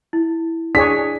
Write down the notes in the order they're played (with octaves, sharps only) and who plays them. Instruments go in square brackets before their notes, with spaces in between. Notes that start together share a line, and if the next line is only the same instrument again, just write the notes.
[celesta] E4
[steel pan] D4 G#4 C#5 [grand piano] B6